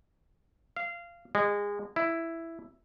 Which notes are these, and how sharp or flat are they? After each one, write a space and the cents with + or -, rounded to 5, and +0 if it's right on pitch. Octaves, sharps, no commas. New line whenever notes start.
F5 -20
G#3 -25
E4 +5